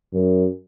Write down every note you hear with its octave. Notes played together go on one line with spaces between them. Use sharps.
F#2